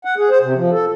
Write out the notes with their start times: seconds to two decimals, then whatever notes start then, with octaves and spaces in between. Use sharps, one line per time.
0.05 F#5
0.18 G#4
0.30 C5
0.42 C3
0.55 F3
0.72 A4